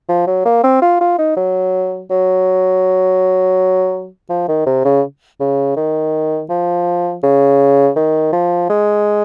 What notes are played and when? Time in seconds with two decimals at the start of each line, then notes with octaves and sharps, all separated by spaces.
0.09 F3
0.27 F#3
0.45 A#3
0.64 C4
0.82 F4
1.01 F4
1.18 D#4
1.37 F#3
2.10 F#3
4.30 F3
4.48 D#3
4.66 C3
4.85 C#3
5.40 C#3
5.76 D#3
6.49 F3
7.23 C#3
7.96 D#3
8.32 F3
8.69 G#3